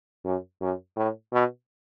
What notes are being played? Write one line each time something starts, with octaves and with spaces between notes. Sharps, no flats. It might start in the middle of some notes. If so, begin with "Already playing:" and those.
F#2
F#2
A2
B2